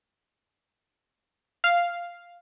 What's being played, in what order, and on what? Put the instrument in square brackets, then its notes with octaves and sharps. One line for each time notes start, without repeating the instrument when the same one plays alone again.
[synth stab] F5